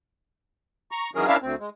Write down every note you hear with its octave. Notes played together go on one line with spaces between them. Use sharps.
A#5 C#6
D#3 E3 F#3 C#4 G#4 A#4
C#4 D4 E4 A#4 E5 F5
D2 C4
G#3